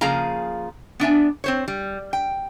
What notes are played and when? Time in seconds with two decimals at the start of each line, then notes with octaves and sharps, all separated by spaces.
0.01 C#3 F3 A#3 G#4 F5 A#5
1.00 B3 D4 E5 G#5
1.44 C4 C5 C#5
1.68 G3
2.13 G5